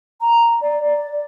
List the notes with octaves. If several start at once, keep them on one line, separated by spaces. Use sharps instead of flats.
A#5
D5
D5